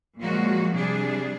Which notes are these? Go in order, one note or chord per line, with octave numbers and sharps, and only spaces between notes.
A#2 F3 F#3 G#3 A#3 F#4
C3 G3 D4 G#4